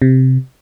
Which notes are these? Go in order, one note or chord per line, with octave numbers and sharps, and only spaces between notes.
C3